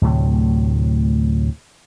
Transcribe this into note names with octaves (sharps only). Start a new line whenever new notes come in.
D2 A2 C3 F#3